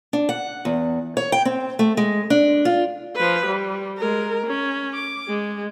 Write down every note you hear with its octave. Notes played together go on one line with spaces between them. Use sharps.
D4
F#5
E2
C#5
G5
C4
A3
G#3
D4
F4
F3 B4
G3
G#3 A#4
C#4
D6
G#3